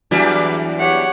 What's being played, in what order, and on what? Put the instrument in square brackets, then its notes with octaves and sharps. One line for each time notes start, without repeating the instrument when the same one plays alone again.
[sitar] E2 E3 G3 [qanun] F#3 D4 G#5
[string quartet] G4 C#5 F#5